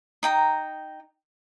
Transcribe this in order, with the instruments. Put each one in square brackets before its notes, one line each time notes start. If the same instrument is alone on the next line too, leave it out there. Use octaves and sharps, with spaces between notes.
[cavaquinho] D#4 G5 A#5